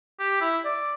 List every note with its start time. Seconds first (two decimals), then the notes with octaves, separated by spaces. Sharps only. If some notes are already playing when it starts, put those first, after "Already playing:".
0.19 G4
0.41 E4
0.65 D5